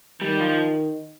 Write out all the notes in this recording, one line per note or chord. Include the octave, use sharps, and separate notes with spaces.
D#3 G3
F3